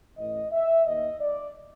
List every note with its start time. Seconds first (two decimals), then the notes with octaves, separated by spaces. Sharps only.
0.17 A1 A2 E3 D#5
0.52 E5
0.86 D#2 D#3 D#5
1.20 D5